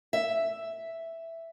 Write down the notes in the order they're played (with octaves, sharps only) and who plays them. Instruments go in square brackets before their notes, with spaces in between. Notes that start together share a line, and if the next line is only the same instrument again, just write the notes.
[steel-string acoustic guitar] E5